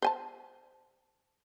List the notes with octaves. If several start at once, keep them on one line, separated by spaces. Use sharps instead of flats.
C5 G#5 A5